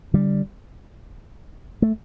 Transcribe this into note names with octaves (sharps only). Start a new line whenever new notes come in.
D3 G3
A3